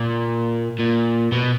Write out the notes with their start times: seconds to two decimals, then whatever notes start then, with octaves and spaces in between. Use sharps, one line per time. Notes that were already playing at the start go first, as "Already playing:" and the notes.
Already playing: A#2
0.79 A#2
1.32 B2